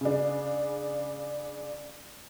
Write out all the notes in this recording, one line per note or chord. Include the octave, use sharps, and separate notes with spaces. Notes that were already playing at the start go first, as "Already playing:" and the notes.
C#3 D4